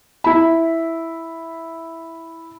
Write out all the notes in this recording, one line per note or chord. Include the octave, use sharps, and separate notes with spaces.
E4 B5